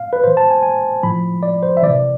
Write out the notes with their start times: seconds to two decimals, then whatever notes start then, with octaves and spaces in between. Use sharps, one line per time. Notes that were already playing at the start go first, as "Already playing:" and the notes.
Already playing: F5
0.13 B4
0.23 A2 E3 C5
0.37 A5
0.50 G#5
0.63 G#5
1.03 A2 F3 B5
1.43 D5
1.63 C5
1.77 E5
1.82 C3 E3 D5